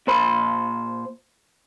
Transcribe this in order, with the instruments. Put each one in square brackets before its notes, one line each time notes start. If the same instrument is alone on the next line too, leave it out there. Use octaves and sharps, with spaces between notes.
[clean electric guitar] A#2 C5 B5